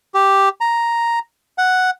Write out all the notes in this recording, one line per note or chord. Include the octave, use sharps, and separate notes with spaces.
G4
A#5
F#5